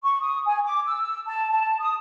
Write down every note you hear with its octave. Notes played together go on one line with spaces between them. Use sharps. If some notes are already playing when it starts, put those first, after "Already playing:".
C#6
D#6
G#5
D6
E6
A5
A5
D#6